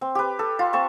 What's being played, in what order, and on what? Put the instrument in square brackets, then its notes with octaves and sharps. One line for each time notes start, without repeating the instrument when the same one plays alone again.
[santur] C4
G4 B4
A4
F4
C4 A5 C#6